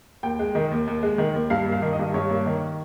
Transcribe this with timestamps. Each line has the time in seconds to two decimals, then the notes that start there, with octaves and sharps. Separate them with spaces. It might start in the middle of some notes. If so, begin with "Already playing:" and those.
0.23 D#2 G5
0.39 G#3
0.55 D#3
0.71 D#2
0.87 D#2
1.03 G#3
1.18 D#3
1.34 D#2
1.50 G2 F5
1.66 A#3
1.72 F5
1.82 D#3
1.93 D#5
1.99 G2
2.14 G2 C#5
2.30 A#3
2.46 D#3